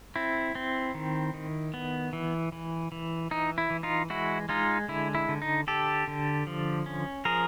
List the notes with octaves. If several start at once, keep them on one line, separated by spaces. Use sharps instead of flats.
C4 E4
C4
D#3
D#3
B3
E3
E3
E3
E3 D#4
E4
E3
D#4 F4
G#3 E4 F#4
G#3 D#4 F4
D3 E4
E4
D3
D#4
D3 G4 A4
D3
F3
C#4
F3 G#4 A#4